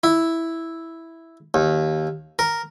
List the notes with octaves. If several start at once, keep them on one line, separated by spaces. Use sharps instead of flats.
E4
D#2
A#4